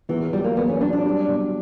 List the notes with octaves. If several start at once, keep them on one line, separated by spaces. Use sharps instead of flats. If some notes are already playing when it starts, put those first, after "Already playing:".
E2 E3
F#3 G3
A#3
E2 B3
C#4
F#3 D4
D4
G3
B2